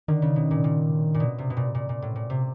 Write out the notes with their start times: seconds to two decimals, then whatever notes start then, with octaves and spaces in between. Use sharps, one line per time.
0.08 D3 D#3
0.22 C#3
0.36 B2
0.51 A#2
0.64 A#2
1.14 A#2
1.20 B2
1.38 C3
1.50 B2
1.57 A#2
1.75 A#2
1.89 A#2
2.02 A2
2.15 A#2
2.30 C3